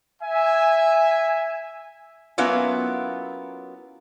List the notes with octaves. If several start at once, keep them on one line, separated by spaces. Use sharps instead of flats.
E5 G#5
F#3 A#3 B3 C#4 E4 F4